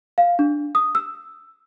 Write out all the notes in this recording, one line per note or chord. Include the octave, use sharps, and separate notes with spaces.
F5
D4
D#6
E6